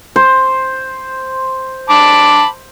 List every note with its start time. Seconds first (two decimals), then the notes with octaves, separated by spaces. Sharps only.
0.16 C5
1.90 A5 B5 D6